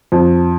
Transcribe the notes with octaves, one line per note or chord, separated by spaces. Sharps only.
F2